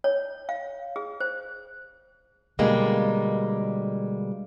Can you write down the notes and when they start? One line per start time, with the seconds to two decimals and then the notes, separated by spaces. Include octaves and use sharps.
0.04 C#5
0.49 F5
0.96 G#4
1.20 C5
2.59 B2 D3 G3 G#3 A#3